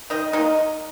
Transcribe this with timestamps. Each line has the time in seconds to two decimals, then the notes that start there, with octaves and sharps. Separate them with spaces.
0.10 D#3 D#4 D#5
0.33 F#3 A#3 D#4 D#5